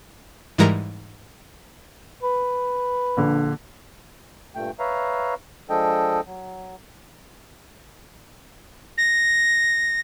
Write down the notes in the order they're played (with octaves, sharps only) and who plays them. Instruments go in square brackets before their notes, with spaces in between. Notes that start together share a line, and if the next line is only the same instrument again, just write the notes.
[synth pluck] G#2 E3 G3 G#3 A#4 A#5
[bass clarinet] B4
[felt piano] A#1 D3
[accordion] G2 A#2 A3 G5
B4 C#5 E5 F5 A#5
F3 G#3 D4 A4 D#5 G5
F#3
[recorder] A#6